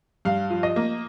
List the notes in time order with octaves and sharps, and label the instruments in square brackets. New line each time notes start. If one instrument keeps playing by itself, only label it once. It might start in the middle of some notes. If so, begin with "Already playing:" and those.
[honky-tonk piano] G2 [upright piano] F5
[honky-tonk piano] F3
[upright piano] D#5
[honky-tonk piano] A#3